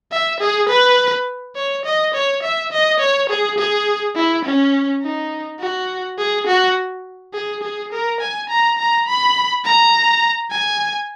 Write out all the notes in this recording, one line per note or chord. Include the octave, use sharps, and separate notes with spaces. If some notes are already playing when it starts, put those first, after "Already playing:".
E5
G#4
B4
C#5
D#5
C#5
E5
D#5
C#5
G#4
G#4
E4
C#4
D#4
F#4
G#4
F#4
G#4
G#4
A#4
G#5
A#5
A#5
B5
A#5
G#5